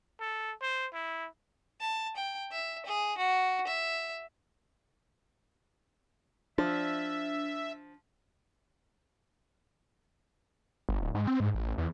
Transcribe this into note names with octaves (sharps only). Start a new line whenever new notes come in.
A4
C5
E4
A5
G5
E5
G#4
F#4
E5
F3 D4 E5
G1
D1
G#2
C4
G#2
A1
E2